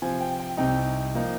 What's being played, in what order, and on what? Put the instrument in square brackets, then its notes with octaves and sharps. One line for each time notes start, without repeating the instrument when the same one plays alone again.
[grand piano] C3 F3 C4 G#5
G5
G5
C2 C3 G3 C4 D#4 G5
F3 A#3 D#4